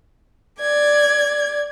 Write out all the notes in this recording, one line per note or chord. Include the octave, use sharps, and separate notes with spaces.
D5 G#6